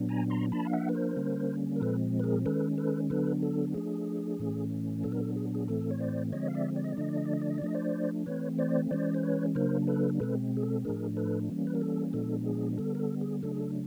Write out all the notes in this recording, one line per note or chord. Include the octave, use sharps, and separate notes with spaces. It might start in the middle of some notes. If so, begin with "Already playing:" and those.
Already playing: A#2 F#3 B3 D4
G#5 A#5
A#5 C6
F3 A#3 D4 A5 B5
F5
E5 F#5
B4
A#4 C5
D3 G3 A#3 C#4
A#4
A#2 F3 G#3 C4 A4 B4
B4
G#4 A#4
D#3 G#3 C#4 A4 B4
A4 B4
D3 F#3 B3 D4 A4 B4
A4
F3 A3 D4 G#4
A2 E3 A3 C#4
A#2 F#3 B3 D4 A4
A#4
A4
G#4
G#4
A2 E3 A3 C4 A4
C#5
C5 D5
D3 F3 G#3 C4 C#5 D#5
F5
D5 E5
D5
D#5
D5
D3 F3 A3 D4 D#5
D5
D#5
D5
D#5
D5
D#5
D5
F3 A3 D4 D#5
C5 D5
E3 A3 C4 B4 C#5
C5 D5
E3 G#3 C#4 C5 D5
C5
B4 C#5
C#3 F#3 A#3 D4 A#4 C5
A4 B4
B2 G#3 C4 A4 B4
G#4
A4
A2 F3 A3 D4 G#4 A#4
A4 B4
E3 G3 A#3 C#4
B4
A#4
A4
A#2 F3 G#3 B3 D4 A4
G#4
D3 G3 B3 A4
A#4
A4
G#4
C#3 F#3 A3 D4 A4
G#4
A4